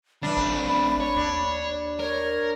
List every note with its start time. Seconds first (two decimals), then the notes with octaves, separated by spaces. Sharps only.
0.23 D3 E3 G3 D4 B5
0.37 A1 A3 C4
1.00 C#5
1.16 D#2 D4
2.00 A#4 C#5